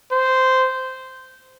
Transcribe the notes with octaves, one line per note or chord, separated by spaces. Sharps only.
C5